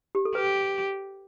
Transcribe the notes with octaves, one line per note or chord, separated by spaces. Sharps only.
G4
A4
G4 B4